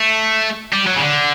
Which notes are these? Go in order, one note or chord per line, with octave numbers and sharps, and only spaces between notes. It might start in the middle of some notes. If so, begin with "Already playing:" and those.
Already playing: A3
G3
F#3
C#3
D3